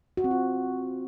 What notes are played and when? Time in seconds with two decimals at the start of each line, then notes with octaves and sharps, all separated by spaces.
0.17 F#4
0.24 C4
0.31 F4